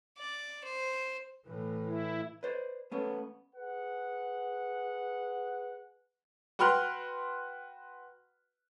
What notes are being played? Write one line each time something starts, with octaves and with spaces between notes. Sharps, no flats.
D5
C5
A2 E3
E4
B4 C5 D5
A3 B3 C#4
G#4 B4 F#5
F#4 B4 G5 C6 F6 F#6